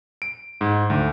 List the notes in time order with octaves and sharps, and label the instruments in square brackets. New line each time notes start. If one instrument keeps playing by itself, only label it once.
[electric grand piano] D7
G#2
D2